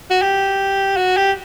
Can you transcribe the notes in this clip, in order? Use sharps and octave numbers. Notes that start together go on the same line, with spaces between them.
F#4
G4
F#4
G4